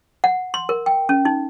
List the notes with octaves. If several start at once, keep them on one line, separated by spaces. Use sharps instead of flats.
F#5
C6
A#4
G5
C#4
D#4